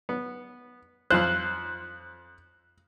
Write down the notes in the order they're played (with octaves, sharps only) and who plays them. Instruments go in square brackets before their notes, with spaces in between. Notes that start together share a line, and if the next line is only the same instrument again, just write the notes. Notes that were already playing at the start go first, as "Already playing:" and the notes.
[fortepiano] B3
[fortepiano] F2 F4 C5 [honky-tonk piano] F#6